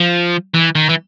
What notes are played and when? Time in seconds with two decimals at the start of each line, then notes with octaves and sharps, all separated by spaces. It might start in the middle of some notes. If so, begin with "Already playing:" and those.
Already playing: F3
0.54 E3
0.75 D#3
0.89 E3